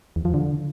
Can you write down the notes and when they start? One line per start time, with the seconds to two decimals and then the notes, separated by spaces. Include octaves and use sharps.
0.16 E2
0.25 F3
0.34 D3